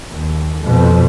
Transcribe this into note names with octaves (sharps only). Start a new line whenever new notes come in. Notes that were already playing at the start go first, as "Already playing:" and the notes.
D#2
F2 B2